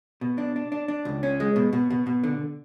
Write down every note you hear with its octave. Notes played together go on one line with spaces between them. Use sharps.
B2
D4
D4
D4
D4
C#2
C#4
G#3
B2
B2
B2
B2
D3